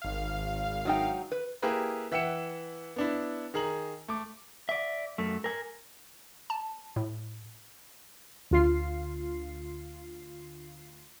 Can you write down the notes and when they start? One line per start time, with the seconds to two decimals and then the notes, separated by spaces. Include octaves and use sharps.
0.02 G#1 F5
0.85 F#3 D#4 G5
1.32 B4
1.62 A#3 E4 G4 G#4 A#4 B4
2.12 E3 E5 F#5 G5 C#7 E7
2.96 B3 D4 E4
3.54 D#3 G#4 A#5 F#7
4.08 A3 D6
4.69 D5 E5
5.18 F#2 A3
5.44 A#4 G#5
6.50 A5
6.96 A2
8.51 D2 F4 C7